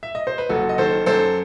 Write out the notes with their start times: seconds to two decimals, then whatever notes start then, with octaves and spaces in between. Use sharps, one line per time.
0.03 E5
0.15 D#5
0.27 C5
0.38 B4
0.49 F#1 F#4 A4
0.69 D#5
0.78 D#3 A4 C5
1.06 F#2 A4 C5